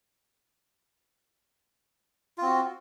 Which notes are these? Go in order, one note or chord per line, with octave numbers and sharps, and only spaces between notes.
C4 F4 F#4